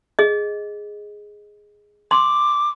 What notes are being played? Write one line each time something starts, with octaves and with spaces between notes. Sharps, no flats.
G#4 D#5
C6 D6